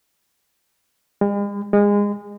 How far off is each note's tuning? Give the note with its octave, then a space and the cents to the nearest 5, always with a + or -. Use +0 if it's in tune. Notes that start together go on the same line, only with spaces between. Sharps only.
G#3 -45
G#3 -25